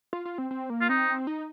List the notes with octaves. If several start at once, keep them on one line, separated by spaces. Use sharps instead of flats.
F4
F4
C4
C4
A#3
F4
C4 D#4
D#4